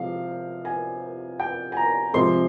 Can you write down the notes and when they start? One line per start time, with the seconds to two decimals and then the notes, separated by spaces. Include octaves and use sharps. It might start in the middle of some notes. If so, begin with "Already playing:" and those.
Already playing: C3 F3 G#3 F5
0.65 G#5
1.40 G5
1.72 G#5
1.77 A#5
2.13 C3 F3 G#3 C6